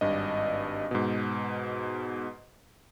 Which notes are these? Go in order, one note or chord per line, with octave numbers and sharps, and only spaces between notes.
G#1 G2 D4 D#5
G#2 B2